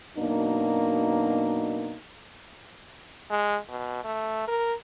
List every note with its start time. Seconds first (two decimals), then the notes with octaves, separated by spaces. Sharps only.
0.17 F#2 B2 A#3 D4 D#4
3.30 G#3
3.69 B2
4.04 A3
4.48 A#4